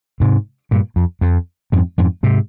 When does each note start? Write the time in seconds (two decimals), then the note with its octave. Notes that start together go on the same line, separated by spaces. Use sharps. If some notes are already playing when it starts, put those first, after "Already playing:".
0.20 G#2 C3
0.71 G2 A#2
0.96 F2
1.21 F2
1.72 F2 G#2
1.98 F2 G#2
2.23 G#2 C3